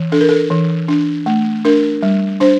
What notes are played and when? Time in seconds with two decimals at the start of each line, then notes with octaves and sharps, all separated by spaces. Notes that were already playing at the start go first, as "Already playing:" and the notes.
Already playing: E3
0.12 D4 A4
0.21 A#4
0.29 A4
0.50 E3
0.88 D4
1.26 A3
1.65 D4 A#4
2.03 G3
2.40 D4 C5